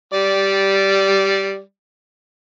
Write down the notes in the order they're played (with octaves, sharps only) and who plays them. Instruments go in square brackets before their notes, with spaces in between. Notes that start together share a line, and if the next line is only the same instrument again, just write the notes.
[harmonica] G3 D5